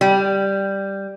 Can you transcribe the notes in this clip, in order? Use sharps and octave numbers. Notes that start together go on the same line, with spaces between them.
G3